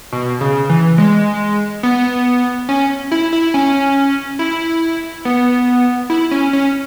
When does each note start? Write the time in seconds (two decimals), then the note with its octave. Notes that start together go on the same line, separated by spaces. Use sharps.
0.12 B2
0.41 C#3
0.69 E3
0.98 G#3
1.83 B3
2.69 C#4
3.12 E4
3.33 E4
3.54 C#4
4.39 E4
5.25 B3
6.10 E4
6.31 C#4
6.53 C#4